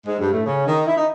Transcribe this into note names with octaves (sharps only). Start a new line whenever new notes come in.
G#2 G#3
G2 G3
A2 A3
C#3 C#4
D#3 D#4
E4
D#4